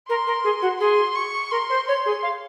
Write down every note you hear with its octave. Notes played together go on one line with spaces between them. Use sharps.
A#4 C6
A#4
G#4
F#4
G#4 C6
C#6
A#4 C6
C5
C#5 C6
G#4
F5